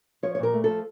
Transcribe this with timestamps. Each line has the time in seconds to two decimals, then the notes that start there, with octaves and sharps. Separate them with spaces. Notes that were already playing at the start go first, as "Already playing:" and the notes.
0.23 F3 C#5
0.35 C#5
0.39 A#2 A#4
0.53 A3
0.64 F3 A4